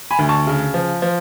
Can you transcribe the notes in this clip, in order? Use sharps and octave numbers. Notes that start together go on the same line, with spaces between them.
G#5 B5
D2
A5 C#6
C#3
F3
F3